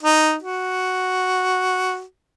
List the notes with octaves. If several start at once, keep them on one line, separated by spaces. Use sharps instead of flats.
D#4
F#4